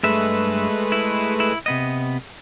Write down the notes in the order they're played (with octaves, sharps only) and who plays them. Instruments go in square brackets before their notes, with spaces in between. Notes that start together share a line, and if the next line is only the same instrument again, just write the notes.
[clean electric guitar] G2 E5 [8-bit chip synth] G#3 A3 B4
[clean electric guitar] E4
E4
C3 B3 D#5